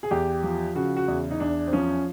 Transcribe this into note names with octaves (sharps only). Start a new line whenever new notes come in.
G#4
E2 G4
F3
C#3 F#4
F#4
E2
D#4
E2 D4
C4
F3 C#4